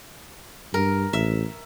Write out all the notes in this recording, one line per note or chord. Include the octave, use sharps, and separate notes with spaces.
G2 A#4
A1 E5